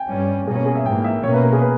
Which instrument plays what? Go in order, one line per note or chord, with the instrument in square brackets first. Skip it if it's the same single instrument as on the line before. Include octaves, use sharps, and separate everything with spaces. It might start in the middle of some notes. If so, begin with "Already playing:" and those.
Already playing: [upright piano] G5 G#5
[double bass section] G2 G3 C#4
[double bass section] B2 A#3 C#4 [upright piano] G#4
[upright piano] G#4
E5
[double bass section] G#2 E3 A#3 [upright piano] G5
[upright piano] E5
[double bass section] B2 A#3 C#4 [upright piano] C#5
[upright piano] B4
A#4
G#4
B4